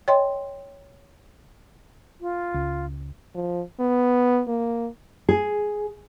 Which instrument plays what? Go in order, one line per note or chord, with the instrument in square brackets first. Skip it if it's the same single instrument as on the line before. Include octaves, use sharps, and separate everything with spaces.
[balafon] C#5 D#5 G5 C6
[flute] F4
[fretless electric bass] C#2
[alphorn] F3
B3
A#3
[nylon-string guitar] G#4